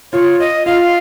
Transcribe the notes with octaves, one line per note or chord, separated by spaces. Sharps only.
F4 C#5
D#5
F4 F5